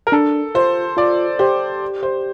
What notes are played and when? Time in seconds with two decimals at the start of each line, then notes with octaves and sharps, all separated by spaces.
0.07 A#4
0.12 D4 A4
0.55 F4 C5
0.97 F4 D5
1.39 G4 C5
2.03 C5